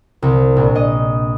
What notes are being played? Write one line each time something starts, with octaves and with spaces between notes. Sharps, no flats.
C2
A#1
D#5